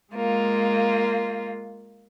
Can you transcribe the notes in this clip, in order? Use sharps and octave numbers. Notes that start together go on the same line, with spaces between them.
G#3 A#3 F4